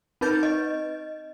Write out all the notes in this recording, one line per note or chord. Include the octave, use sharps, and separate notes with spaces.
C4 D#4 B4 G6 A6
D#5